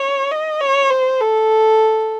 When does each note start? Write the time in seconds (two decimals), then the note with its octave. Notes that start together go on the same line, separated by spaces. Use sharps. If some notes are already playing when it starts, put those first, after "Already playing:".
Already playing: C#5
0.31 D#5
0.61 C#5
0.91 C5
1.21 A4